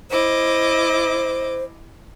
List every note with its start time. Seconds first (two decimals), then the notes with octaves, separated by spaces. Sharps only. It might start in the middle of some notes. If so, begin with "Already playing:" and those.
0.11 E4 C5 D#5 D6